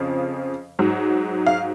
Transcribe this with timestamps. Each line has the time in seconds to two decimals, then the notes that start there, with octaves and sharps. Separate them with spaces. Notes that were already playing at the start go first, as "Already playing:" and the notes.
Already playing: F2 C#3 F3
0.79 G#2 F#3
1.46 F5